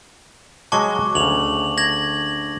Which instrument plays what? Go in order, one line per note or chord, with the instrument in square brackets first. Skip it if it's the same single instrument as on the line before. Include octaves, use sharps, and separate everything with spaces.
[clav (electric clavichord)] F#3 G#3 F#5 [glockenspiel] A5 C#6 D6
[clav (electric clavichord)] D2 C#3 [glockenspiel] F7 F#7
[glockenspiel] G#6 A#6 F#7